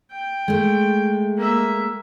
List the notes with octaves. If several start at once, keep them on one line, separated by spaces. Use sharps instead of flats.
G5
G#3 A3
A#3 E5